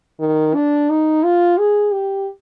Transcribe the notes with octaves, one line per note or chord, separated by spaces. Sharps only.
D#3
D4
D#4
F4
G#4
G4